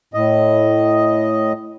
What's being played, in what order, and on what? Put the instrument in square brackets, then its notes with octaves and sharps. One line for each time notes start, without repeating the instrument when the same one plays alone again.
[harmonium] A2 D#5